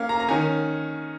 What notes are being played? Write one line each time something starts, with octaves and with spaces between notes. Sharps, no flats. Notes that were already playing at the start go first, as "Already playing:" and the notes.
Already playing: A#3 C#4 F5
A#5
A#5
D#3 C#4 G#5